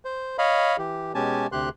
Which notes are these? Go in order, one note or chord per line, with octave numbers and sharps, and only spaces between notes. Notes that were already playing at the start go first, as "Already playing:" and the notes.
C5
C#5 D#5 F5 B5
E3 G4
B2 G#3 C#4 G4 G#5 A5
D2 C3 G4 C6 F#6